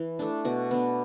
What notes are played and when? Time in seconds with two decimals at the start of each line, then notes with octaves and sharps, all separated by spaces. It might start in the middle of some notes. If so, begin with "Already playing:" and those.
Already playing: E3
0.19 A3 D4
0.45 B2 F#4
0.71 B3 D4